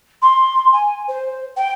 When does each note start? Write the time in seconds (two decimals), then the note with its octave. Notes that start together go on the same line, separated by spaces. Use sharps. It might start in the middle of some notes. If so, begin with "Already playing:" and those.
0.22 C6
0.72 G#5
1.08 C5
1.56 G5